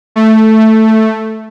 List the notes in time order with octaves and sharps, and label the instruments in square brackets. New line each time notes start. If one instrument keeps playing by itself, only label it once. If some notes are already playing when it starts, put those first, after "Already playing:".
[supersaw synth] A3